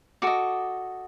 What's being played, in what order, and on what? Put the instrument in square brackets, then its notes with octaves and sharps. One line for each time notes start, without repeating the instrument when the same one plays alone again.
[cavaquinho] F#4 A4 D#5 D6